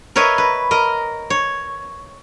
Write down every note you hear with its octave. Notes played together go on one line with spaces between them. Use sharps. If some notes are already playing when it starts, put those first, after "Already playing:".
A#4 B4 C#5 D#5 E5
B4
A#4 D#5
C#5